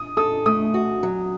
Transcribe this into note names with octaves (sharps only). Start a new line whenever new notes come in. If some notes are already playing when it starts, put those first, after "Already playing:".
Already playing: D#6
A4 D#6
A3 D#6
F#4
F#3